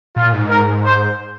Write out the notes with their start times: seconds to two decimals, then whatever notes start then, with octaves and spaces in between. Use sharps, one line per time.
0.16 A#2 F4
0.33 G#2
0.49 A#4
0.83 C5